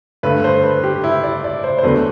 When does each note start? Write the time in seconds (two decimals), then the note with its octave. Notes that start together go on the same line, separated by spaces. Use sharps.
0.23 G2 D3 A3 B4
0.44 C5
0.64 B4
0.84 G4
1.04 E4
1.23 D5
1.44 D5
1.64 C5
1.79 C5
1.83 E2 D3 F#3 A3 B4